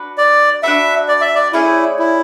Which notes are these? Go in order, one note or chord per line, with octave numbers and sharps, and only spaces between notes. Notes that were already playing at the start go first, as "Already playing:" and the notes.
Already playing: D4 F#4 B4 F#5
D5
D4 F#4 B4 E5 F#5
D5
E5
D5
A3 C#4 E4 G#4 D5
E4